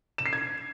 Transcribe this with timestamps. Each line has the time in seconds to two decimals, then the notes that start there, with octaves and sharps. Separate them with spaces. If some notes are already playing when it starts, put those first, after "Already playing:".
0.18 E7
0.26 C7
0.33 G#6